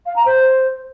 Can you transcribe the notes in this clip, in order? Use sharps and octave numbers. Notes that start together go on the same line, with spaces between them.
F5
A#5
C5